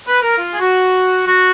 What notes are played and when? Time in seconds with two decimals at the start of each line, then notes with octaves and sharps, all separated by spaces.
0.08 B4
0.22 A#4
0.37 F4
0.52 G#4
0.60 F#4
1.26 F#4